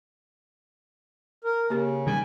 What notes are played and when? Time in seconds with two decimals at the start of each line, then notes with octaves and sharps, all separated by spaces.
1.44 A#4
1.70 C#3 A#3 G4 A#4
2.07 D#3 G3 G#5